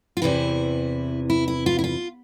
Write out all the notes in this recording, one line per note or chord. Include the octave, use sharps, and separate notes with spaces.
F4
E2 C3 E3 E4
E4
E4
F4
E4
F4